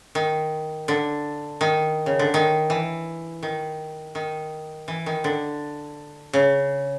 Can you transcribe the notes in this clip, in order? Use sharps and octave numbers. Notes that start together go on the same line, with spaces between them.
D#3
D3
D#3
C#3
D3
D#3
E3
D#3
D#3
E3
D#3
D3
C#3